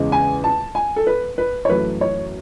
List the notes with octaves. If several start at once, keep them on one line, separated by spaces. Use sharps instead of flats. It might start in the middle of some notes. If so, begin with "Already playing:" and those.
Already playing: E2 C#3 G#3
G#5
A5
G#5
A4
B4
B4
C#5
F#2 E3 A3 B4
C#5